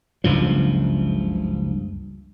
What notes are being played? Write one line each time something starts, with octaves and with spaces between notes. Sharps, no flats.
F#1 C#2 G2 F3